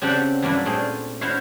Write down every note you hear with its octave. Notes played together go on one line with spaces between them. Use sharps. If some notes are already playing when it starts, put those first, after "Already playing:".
C#3 C4 D4 G4 E5 F#5
G2 F#3 A#3 C#4 D4 E4
A#2 A3 C4 G#4
E4 F#4 C5 C#5 F5